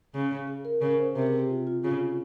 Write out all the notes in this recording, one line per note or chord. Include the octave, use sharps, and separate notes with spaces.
C#3
G#4
A#4
C#3 A#4
C5
C3 A#4
G#4
G4
F4
F4
C#3 F4